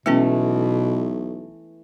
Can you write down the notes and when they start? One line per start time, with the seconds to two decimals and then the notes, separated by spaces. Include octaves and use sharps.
0.06 B1 B2 E3 G#3 A3 B3 C#4